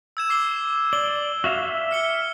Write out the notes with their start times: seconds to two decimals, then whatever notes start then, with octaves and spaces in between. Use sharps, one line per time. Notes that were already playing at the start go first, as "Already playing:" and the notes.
0.17 E6 G#6 E7
0.29 D6 C7 G7
0.93 D5 G7
1.44 F#4 E5 F5
1.62 E5
1.91 F6 C#7 G7